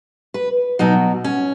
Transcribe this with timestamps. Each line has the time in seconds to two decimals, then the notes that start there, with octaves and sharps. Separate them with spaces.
0.34 B4
0.79 B2 F#3 D#4
1.24 C#4